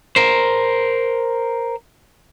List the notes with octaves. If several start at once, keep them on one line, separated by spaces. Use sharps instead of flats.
A#4 C5